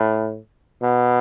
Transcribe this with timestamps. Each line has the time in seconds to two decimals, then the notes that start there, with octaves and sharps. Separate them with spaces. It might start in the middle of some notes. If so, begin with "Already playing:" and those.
Already playing: A2
0.82 B2